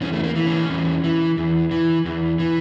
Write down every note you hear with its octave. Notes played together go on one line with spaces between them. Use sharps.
E2 C#4
A3
A#3
E3
C#4
E2
E3
E2
E3
E2
E3